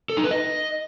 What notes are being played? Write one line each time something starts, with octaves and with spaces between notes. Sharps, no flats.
A4
D#4
B4
D#5